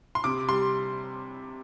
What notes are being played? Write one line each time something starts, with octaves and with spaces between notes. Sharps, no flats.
C6
C3 D6
G3 C6